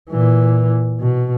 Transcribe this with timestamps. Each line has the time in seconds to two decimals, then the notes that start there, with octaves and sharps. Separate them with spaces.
0.10 A#2 E3
1.01 B2